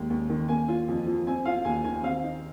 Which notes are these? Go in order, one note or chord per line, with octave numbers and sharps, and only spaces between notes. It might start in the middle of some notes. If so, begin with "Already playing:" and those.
Already playing: D#2 G#3
D#2
D#3
A#3 G#5
F4
F2
F3
C4 G#5
F4 F5
D#2 G#5
D#3 G#5
C4 F5
D#4